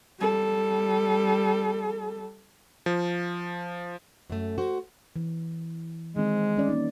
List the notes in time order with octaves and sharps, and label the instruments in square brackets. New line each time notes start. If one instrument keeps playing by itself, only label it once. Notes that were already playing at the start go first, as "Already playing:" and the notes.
[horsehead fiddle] G3 A4
[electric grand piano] F3
[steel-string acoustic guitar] F#2 A3
F#4 C5
[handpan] E3
[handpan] D#3 C4 [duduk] G#3
[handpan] G3 C#4 D5
A#3 C#4 D#4